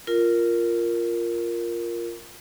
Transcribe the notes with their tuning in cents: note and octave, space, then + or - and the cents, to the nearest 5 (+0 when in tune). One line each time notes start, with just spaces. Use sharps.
F4 -5 A#4 +0